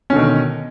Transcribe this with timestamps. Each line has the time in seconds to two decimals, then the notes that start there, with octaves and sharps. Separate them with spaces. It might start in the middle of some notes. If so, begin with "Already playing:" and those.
0.10 C#4
0.13 D3
0.16 B2
0.19 D#3